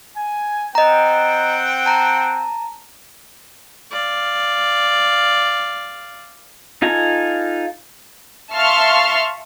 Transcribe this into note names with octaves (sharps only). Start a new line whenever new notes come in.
G#5
C4 D#5 F#5 G5 A#5
A5 A#5
D5 F5
D#4 F4 A4 G#5 A#5
E5 F5 A5 C6 C#6 F6